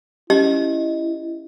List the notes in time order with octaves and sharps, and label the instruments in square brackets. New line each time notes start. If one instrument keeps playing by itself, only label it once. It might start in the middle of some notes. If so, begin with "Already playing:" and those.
[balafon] C#4 [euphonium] E4 [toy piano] G4 [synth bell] D#5